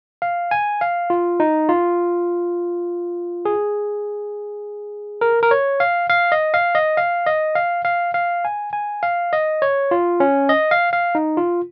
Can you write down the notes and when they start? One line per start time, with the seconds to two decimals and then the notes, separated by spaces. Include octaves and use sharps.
0.22 F5
0.51 G#5
0.81 F5
1.10 F4
1.40 D#4
1.69 F4
3.45 G#4
5.21 A#4
5.43 A#4
5.51 C#5
5.80 F5
6.10 F5
6.32 D#5
6.54 F5
6.75 D#5
6.97 F5
7.27 D#5
7.55 F5
7.85 F5
8.14 F5
8.45 G#5
8.73 G#5
9.03 F5
9.33 D#5
9.62 C#5
9.91 F4
10.20 C#4
10.49 D#5
10.71 F5
10.93 F5
11.15 D#4
11.37 F4